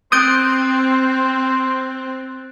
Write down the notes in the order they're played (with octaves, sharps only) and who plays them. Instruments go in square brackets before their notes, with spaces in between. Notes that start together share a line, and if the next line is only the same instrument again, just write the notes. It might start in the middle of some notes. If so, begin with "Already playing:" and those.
[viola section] C4 [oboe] C5 [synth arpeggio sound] D#6 G6 [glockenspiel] F#6 A6 D7